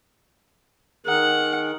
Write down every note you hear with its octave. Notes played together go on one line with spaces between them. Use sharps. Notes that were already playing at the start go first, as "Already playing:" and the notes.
D#3 G#4 A#4 F#5